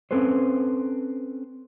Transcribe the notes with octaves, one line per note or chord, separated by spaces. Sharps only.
C4 C#4 A4 B4 C5